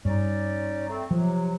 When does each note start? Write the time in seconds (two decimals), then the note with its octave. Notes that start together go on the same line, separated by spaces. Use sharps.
0.05 G2 C#4 D#4 D5
0.89 A3 C4
1.11 C3 F3 F#3